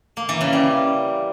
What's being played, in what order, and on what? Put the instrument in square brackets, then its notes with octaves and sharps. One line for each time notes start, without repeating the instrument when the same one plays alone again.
[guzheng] A#3
E3
C#3
G3